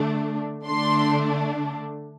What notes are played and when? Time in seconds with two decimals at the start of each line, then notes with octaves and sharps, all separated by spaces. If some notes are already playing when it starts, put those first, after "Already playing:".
Already playing: D3 A3 D4
0.66 D3 A3 D4 C6